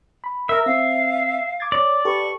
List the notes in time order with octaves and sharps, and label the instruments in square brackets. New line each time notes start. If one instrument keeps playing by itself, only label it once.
[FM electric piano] B5
[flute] A#4 [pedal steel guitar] E5
[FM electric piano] C4 [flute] F5
[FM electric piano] D6 G#6 A6
[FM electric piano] C#5 [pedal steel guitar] D5
[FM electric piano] G4 A4 B4 [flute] C#6